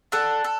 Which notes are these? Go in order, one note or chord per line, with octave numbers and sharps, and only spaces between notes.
D4 A4 F#5
A4